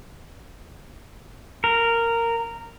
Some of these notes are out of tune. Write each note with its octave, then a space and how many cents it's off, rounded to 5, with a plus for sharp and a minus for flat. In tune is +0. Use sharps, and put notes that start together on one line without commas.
A#4 -10